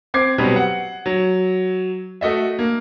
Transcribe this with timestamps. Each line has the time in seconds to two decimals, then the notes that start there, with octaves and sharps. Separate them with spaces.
0.14 C4 D6 G#6 C7
0.38 B2 F#3 G3 B3 C4
0.56 F#5
1.06 F#3
2.21 A3 F#4 D#5 E5
2.59 A#3